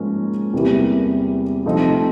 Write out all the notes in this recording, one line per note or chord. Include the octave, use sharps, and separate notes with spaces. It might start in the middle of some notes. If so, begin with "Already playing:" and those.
Already playing: G#2 F3 A#3 C#4
E2 C3 E3 G3 A#3
C3 F3 A3 C4 D#4